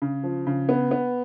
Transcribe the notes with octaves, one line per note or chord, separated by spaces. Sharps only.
C#3
F3
C#3
B3
B3